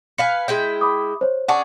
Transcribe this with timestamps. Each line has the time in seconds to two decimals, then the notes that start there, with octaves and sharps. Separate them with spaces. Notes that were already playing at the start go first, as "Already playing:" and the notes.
0.18 B4 F5 G#5 C#7
0.48 G#3 E4 G5
0.81 B5 D6 D#6
1.21 C5 C#5
1.48 C#4 D4 G#4 F#5 A5 C#6